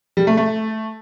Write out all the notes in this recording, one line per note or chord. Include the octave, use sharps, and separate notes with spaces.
G3
A3
A3